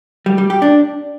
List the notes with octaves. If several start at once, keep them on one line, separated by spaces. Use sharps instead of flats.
G3
G3
G4
D4